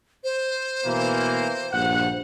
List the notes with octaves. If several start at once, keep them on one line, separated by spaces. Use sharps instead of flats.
C5
B2 E3 A#3
A#1 G2 F#5